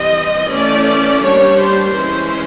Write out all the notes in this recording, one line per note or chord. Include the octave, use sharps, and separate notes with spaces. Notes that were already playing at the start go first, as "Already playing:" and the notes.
Already playing: E3 G3 C4 D#5
E3 A3 C#4 D5
G3 A#3 D4 C#5
C5
E3 G#3 C#4